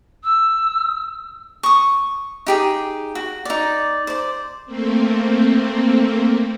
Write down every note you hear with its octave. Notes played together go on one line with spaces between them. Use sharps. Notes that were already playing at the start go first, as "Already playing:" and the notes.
E6
C#6 D#6
D#4 G4 G#4
F#4
D#4 D5
C5 D5
A3 A#3 C4